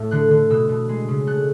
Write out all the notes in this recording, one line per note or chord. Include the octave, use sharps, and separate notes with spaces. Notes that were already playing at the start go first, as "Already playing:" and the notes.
Already playing: A2 A3 E6
D3 F#6
D3
B2 E6
B2
G#3
C#3
A3 F#6